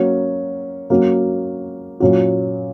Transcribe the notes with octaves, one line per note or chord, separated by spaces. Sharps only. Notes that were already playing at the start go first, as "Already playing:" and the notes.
Already playing: F#3 A#3 C#4 F#4
F#3 A#3 C#4 F#4
A#2 F#3 C#4 F#4